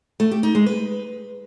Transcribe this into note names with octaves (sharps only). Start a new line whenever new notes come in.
A3
G4
D#4
G#3
B4